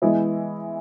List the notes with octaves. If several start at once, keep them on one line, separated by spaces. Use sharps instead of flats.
E3 G#3 B3 E4